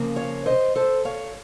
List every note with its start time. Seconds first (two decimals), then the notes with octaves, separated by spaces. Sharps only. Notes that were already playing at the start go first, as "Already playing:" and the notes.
Already playing: C#3 F3 A#3
0.16 C#5 F5
0.46 C5 D#5
0.76 A4 C5
1.05 C#5 F5